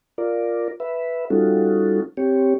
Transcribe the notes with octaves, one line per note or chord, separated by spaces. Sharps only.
F4 A#4 D5
B4 E5
G3 C#4 D#4 F4 F#4 A4
C4 G4 C#5